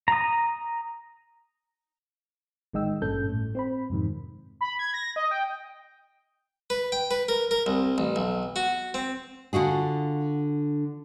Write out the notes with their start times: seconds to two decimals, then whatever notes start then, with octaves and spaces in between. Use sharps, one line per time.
0.08 A#5 D#6
2.73 A1 D#3 G#3 D#5 G5 E6
3.01 G#1 G2 A#2 C#4 A4 G6
3.29 A2
3.55 C4 C5 B5
3.90 F2 G#2 C3 D#3
4.61 B5
4.79 G#6
4.94 A#6
5.16 D#5
5.31 G5
6.70 B4
6.92 G5
7.11 B4
7.29 A#4
7.51 A#4
7.66 C2
7.98 A1
8.16 B1
8.56 F#4
8.94 C4
9.53 D3 F4 F#4 G#4